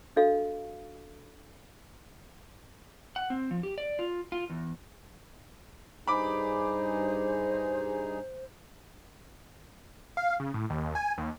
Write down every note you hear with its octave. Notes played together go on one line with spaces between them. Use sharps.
D4 F#4 A4 D#5 F5
F#5
C4
F3
G4
D5
F4
F4
E2
G2 D#4 G#4 C5 B5 D6
F5
C#3
A2
D#2
G#5
D#2